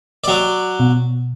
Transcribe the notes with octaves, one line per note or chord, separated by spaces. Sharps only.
F#3 D5
B2